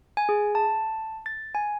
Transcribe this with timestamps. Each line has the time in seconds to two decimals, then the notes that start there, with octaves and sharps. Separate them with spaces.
0.17 G#5
0.29 G#4
0.55 A5
1.26 A6
1.55 G#5